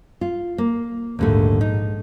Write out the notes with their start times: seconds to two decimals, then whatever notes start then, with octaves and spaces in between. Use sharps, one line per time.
0.21 F4
0.58 A#3
1.19 A#1 D#2 G#2 D3 A3
1.61 D#4